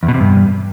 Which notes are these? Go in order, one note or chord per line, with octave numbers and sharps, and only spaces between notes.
E2
B2
C3
G2